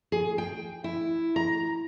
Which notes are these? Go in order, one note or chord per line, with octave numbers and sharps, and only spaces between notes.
G#4
G5
E4
A#5